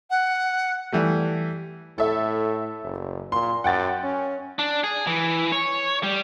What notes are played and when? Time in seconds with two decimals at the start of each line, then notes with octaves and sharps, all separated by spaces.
0.10 F#5
0.92 E3 G3 A3
1.98 A2 A4 E5
2.83 F#1
3.32 A#2 C6
3.64 F#2 F#5 G5 A6
4.04 C#4
4.59 D4
4.84 G#4
5.07 E3
5.52 C#5
6.03 G3